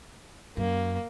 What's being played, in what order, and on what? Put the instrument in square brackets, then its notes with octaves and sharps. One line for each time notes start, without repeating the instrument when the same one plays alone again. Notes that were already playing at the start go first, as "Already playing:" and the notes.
[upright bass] F#2 [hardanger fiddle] A#3